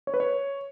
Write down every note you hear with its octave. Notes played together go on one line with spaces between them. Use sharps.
C#5
B4
C#5